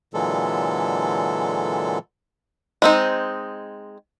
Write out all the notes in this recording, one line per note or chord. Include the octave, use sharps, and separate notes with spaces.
A#2 D3 E3 F#3 G#3 A4
G#3 C4 D#4